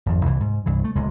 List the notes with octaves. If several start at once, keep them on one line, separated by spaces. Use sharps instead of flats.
G#1 F2
C2 E3
G#2
C2 G2 E3
A3
D1 C#2 G#3